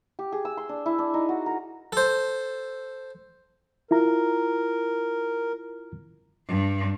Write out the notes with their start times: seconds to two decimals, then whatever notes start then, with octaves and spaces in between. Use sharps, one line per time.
0.19 G4
0.32 G#4
0.45 E6
0.57 C6
0.69 D4
0.86 E4
0.98 D4
1.14 D#4
1.29 F#4
1.46 A#4
1.92 A4 C5
3.91 E4 F4 A#4 A#5
6.48 G2